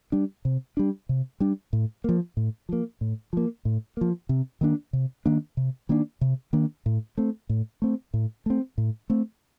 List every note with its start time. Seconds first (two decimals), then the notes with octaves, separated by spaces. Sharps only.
0.12 G3 D4
0.45 C3
0.77 G3 D4
1.09 C3
1.40 G3 D4
1.73 A2
2.04 F3 A#3
2.37 A2
2.69 F3 A#3
3.01 A2
3.33 F3 A#3
3.65 A2
3.97 F3 A#3
4.29 C3
4.61 D#3 A#3 D4
4.93 C3
5.26 D#3 A#3 D4
5.57 C3
5.89 D#3 A#3 D4
6.21 C3
6.53 D#3 A#3 D4
6.86 A2
7.18 A3 C4
7.50 A2
7.82 A3 C4
8.14 A2
8.46 A3 C4
8.78 A2
9.10 A3 C4